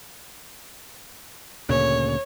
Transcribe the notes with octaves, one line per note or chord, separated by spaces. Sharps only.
D2 A#2 C#3 C#5